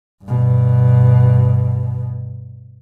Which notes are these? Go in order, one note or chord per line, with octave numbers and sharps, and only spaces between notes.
G2 B2